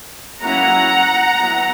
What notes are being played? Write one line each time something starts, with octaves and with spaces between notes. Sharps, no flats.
F#3 A#3 C#4 E4 F#5 A#5
F#3 B3 E4